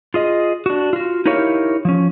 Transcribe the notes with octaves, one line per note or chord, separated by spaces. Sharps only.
F4 G#4 D#5
D4 F#4
F4 F#4
D#4 E4 G4 A#4 C#5 F5
F3 C#4